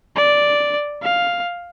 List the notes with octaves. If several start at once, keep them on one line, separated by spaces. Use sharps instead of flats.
D5
F5